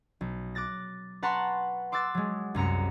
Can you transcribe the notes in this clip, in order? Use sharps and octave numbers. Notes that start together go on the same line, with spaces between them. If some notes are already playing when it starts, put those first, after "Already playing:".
B1
D6 F#6 A6 A#6
B4 F#5 A5 A#5 C6 C#6
C6 D6 E6 F#6 A6
F#3 G#3
C2 F#2 A#5 C#7